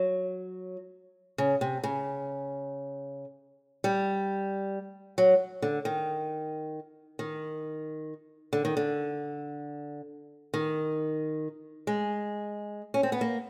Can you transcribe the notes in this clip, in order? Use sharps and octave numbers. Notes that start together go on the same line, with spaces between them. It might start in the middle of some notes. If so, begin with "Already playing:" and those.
Already playing: F#3
C#3
C3
C#3
G3
F#3
D3
D#3
D#3
D3
D#3
D3
D#3
G#3
C#4
C4
B3
A#3